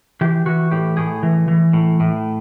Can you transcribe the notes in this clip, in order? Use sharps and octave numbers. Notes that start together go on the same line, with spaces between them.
E3 G4
E3 F#4
A2 G4
A2 G#4
E3
E3
A2
A2